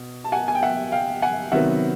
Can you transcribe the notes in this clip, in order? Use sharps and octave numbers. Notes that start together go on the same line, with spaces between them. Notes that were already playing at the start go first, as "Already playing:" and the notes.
Already playing: B2
A5
F#5 G#5
G#5
G5
E5 F#5
F5 G5
F#5 G#5
C3 D#3 F#3 B3 E5 F#5